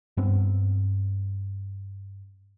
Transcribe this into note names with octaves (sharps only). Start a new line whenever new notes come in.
G2 B3 C4